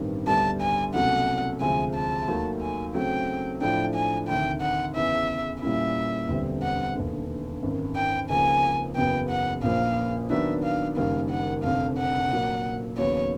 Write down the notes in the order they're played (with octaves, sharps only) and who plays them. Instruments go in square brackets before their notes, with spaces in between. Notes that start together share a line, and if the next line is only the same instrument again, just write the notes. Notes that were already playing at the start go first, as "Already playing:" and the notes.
Already playing: [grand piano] A1 G2 D#3 G3 C4
[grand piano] D2 D3 G3 B3 [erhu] A5
[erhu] G#5
[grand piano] C2 B2 F#3 A3 C#4 [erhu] F#5
[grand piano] D2 C3 F3 G#3 [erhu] G#5
[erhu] A5
[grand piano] D#2 D#3 F#3 A3
[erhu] G#5
[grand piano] C#3 F#3 A3 C4 [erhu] G5
[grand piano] A2 F3 A3 D4 [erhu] G5
[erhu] G#5
[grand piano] D2 C3 D#3 [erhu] G5
[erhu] F#5
[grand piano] E2 C#3 E3 [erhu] E5
[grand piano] A#2 G3 A#3 C#4 E4 [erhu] E5
[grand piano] E1 D2 D3 G3 C4
[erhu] F#5
[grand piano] E1 D#2 D3
G#1 F#2 D#3
[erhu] G5
[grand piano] C#2 C#3 F3 A#3 [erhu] G#5
[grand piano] F#1 E2 C#3 F#3 B3 [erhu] G5
[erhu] F#5
[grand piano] A#1 A#2 F3 A#3 [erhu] F5
[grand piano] D#3 F#3 B3 D4 [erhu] E5
[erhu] F5
[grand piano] F#1 F#2 D#3 G3 A#3 [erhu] F5
[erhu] F#5
[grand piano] F1 F2 D3 [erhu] F5
[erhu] F#5
[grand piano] A#2 F#3 A#3
[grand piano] D#2 C#3 F#3 B3 [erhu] C#5